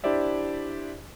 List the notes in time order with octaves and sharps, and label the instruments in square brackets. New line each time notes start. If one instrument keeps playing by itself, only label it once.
[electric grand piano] D4 E4 G4 C5 D5 E5